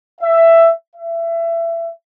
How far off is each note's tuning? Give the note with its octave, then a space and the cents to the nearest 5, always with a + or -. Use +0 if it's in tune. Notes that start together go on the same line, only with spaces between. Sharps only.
E5 +10
E5 +25